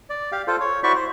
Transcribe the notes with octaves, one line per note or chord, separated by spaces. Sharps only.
D5
G4 F5
F4 A4 C5
C#5
E4 F#4 C5 D5 E5 C#6
C5